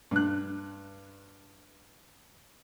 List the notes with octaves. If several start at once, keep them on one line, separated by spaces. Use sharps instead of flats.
G2 F#6